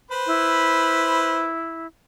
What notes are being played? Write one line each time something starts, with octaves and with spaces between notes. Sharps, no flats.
B4 C5 B5
E4